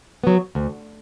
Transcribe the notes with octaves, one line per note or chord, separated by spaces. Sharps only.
F#3 B3
D2